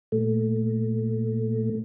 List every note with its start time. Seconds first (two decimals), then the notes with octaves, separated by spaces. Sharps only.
0.12 A#2 A3